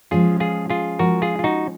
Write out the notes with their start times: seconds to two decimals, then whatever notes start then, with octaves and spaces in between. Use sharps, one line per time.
0.11 F3 G#3 C#4 F4 G#4
0.40 F4 G#4
0.70 F4 G#4
0.99 F3 G#3 C#4 F#4 A#4
1.22 F4 G#4
1.39 F4
1.44 D#4 F#4